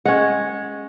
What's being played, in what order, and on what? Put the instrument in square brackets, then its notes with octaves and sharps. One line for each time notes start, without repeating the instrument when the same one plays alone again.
[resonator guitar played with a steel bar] G#3 [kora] C#4 F#5